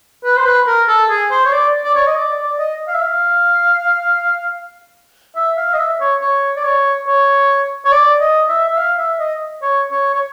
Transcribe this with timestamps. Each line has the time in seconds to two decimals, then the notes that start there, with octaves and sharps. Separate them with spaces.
0.24 B4
0.37 C5
0.46 B4
0.67 A#4
0.88 A4
1.09 G#4
1.31 C5
1.45 C#5
1.52 D5
1.84 D5
1.95 C#5
2.07 D#5
2.16 D5
2.37 D5
2.59 D#5
2.88 F5
2.94 E5
3.02 F5
5.36 E5
5.57 F5
5.74 D#5
5.79 E5
6.00 C#5
6.21 C#5
6.56 D5
6.64 C#5
7.07 C#5
7.85 C#5
7.92 D5
8.20 D#5
8.49 E5
8.68 E5
8.77 F5
8.98 E5
9.20 D#5
9.62 C#5
9.91 C#5
10.14 C#5